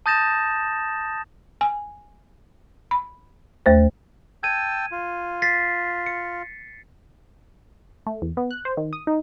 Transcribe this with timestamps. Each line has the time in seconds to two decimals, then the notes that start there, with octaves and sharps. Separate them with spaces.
0.06 A5 D#6 G6 A6 A#6 E7
1.61 G#5
2.91 B5
3.66 D#2 A3 C5
4.43 G5 A5 E6 G#6 D#7
4.92 F4
5.42 A6 B6 C7
6.06 C#7
8.07 A3
8.22 E2
8.37 B3
8.51 F#6
8.65 C5
8.77 D#3
8.93 D#6
9.07 D#4